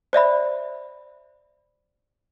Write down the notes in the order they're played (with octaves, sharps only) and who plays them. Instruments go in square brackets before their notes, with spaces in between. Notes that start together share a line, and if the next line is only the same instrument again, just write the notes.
[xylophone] C5 D5 E5 B5